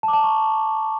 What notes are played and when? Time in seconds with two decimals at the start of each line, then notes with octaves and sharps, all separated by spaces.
0.03 A5
0.08 D6
0.13 A5
0.19 A#5
0.24 C#6